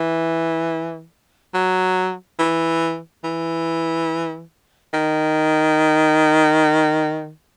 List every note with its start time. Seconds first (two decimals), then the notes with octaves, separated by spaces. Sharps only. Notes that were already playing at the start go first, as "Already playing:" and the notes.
Already playing: E3
1.54 F#3
2.39 E3
3.24 E3
4.94 D#3